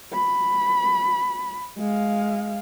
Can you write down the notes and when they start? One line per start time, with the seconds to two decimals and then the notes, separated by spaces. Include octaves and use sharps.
0.13 B5
1.79 G#3 F5